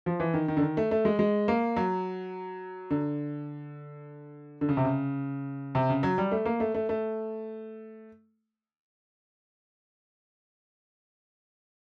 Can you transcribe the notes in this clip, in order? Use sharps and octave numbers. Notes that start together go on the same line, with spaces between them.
F3
E3
D#3
D#3
D3
D#3
A3
A3
G#3
G#3
A#3
F#3
D3
D3
C#3
C3
C#3
C3
C#3
F#3
G3
A3
A#3
A3
A3
A3